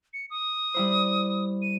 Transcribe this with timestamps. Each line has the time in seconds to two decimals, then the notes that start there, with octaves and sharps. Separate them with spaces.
0.13 C#7
0.30 D#6
0.74 G3 E4 C5
1.62 D#7